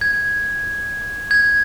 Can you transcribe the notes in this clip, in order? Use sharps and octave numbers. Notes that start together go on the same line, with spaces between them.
G#6
G#6